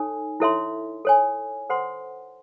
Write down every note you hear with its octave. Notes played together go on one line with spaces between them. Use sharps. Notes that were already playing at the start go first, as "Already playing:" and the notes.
Already playing: D#4 A4 C#5 G#5
E4 A4 C#5 E5 C6
A4 C#5 G#5
A4 C5 F#5 C6